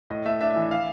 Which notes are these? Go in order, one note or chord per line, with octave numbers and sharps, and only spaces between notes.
A2 D#5
A3 E5
D4 E5
E5
E3
E5
F5